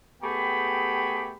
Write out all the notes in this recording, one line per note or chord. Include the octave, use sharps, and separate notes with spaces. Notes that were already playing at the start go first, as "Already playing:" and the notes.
A3 B3 G4 G#4 G5 B5